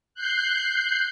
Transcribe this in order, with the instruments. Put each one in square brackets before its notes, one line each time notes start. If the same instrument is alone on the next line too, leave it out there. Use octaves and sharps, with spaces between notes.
[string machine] F#6 G6 C7